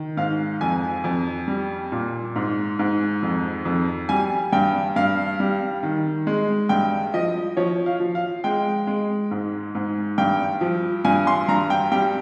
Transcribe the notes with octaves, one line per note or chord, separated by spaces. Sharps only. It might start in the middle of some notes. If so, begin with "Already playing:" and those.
Already playing: D#3
G#2 F5
F2 G#5
F2
G3
A#2
G#2
G#2
F2
F2
G3 G#5
G2 G5
G2 F5
G3
D#3
G#3
G2 G5
F3 D#5
F3 C#5
F5
F3
F5
G#3 G5
G#3
G#2
G#2
G2 G5
F3
G2 G#5
C6
G2 A#5
G5
G3 G5